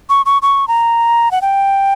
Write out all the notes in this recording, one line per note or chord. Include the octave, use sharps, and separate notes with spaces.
C#6
C#6
C#6
A#5
F#5
G5